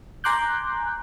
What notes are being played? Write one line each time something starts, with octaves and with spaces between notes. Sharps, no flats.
G#5 A#5 C6 D6 F#6 G6